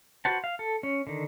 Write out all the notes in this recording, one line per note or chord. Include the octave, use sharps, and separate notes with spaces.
F#4 B4 C5 F#5 A5
F5
A4
C#4
D3 D#3